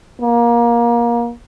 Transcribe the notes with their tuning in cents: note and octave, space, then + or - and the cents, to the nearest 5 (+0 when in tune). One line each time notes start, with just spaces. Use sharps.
A#3 +25